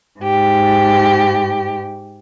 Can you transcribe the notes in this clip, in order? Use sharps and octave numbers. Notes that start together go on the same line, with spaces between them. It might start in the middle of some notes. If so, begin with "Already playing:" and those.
G#2 G4